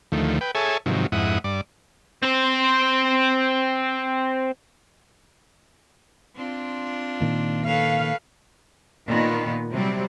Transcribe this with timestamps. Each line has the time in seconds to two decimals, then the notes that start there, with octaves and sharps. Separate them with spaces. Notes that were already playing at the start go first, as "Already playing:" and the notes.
0.12 D2 D#3 F3 A3
0.41 B4 G5
0.55 G#4 A4 C#5 E5 G#5 A5
0.86 G#2 C3 D#3 F3 F#3
1.12 F2 G#2 E4 F#5 D#6
1.44 G2 D5
2.23 C4 C5
6.36 C4 D4 F4
7.21 A#2 D#3 A#3
7.67 A4 B4 C#5 F5
9.06 A#2 D#3 B3
9.71 C3 F#3 G3 C4